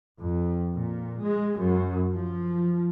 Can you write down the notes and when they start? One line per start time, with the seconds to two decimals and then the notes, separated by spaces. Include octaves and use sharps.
0.20 F2
0.73 A#2
1.20 G#3
1.59 F#2
2.13 F3